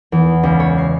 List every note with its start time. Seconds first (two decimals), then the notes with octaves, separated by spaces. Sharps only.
0.12 E2
0.43 C#2
0.60 C#5
0.78 C7